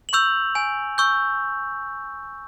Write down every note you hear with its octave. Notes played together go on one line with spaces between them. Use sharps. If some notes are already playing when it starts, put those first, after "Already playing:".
F#7
C#6 E6 G6 F7
G#5
C#6 E6 G6